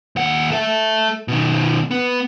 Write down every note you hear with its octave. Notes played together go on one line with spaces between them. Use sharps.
D#2 F#5
A4 E5
B2 D#3
B3